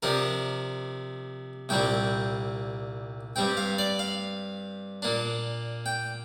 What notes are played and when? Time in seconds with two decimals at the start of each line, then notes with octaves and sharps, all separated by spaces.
0.03 C3 F3 D4 A#4
1.69 C2 A#2 G3 C4 G5
3.36 G2 G3 C4 G5
3.57 F5
3.78 D5
3.99 F5
5.02 A#2 A#3 D4
5.86 G5